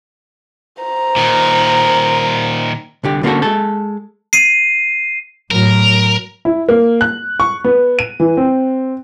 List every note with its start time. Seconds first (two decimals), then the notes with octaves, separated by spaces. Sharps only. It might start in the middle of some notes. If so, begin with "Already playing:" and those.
0.83 C5 A#5
1.16 A#2 D#3
3.04 C2 D3 G4
3.23 D3 A#3 B3 C#4 F#4 A4
3.42 G#3 A4
4.33 C7 D#7
5.51 A2 F#3 A#4
6.45 E4
6.69 A#3
7.01 F#6
7.40 C#6
7.64 B3
7.99 D#7
8.20 E3
8.37 C4